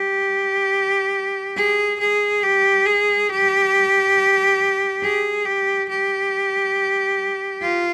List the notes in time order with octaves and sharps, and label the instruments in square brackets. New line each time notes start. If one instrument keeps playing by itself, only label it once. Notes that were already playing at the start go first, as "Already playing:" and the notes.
Already playing: [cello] G4
G#4
G#4
G4
G#4
G4
G#4
G4
G4
F4